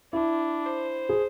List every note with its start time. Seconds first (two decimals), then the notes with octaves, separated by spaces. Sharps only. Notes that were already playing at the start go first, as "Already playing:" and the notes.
0.13 D4 E4
0.66 C5
1.09 G#4